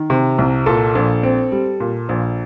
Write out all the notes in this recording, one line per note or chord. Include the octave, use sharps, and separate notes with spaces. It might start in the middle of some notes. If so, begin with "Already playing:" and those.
Already playing: D#3
C3
C2
A#2 A4
A#1
C4
G3
A#2
A#1